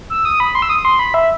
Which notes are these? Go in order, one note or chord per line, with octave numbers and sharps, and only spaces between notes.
E6
D#6
B5
C6
E6
D#6
C6
B5
E5